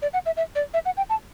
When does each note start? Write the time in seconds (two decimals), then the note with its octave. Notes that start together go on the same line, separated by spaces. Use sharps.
0.02 D5
0.14 F#5
0.26 E5
0.37 E5
0.55 D5
0.74 E5
0.86 F#5
0.97 G5
1.10 A5